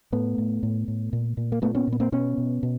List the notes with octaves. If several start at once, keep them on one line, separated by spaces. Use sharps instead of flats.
A2 A3 B3
A2
A2
A2
A#2
A#2
A#3
A#2 A3 B3
B3 C#4
A#2
B3
A#3 C4
B2 B3 C#4
B2
B2